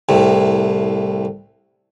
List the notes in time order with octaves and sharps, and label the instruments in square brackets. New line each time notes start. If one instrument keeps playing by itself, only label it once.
[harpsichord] C2 A2 C3